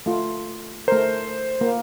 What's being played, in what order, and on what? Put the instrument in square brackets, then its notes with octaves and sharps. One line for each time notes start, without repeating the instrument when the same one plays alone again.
[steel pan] A3 F4
[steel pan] A3 A#4 [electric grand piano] C5
[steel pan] A#3